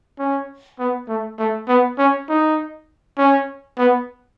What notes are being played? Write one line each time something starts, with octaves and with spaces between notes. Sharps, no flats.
C#4
B3
A3
A3
B3
C#4
D#4
C#4
B3